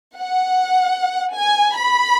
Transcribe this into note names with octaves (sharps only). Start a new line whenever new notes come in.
F#5
G#5
B5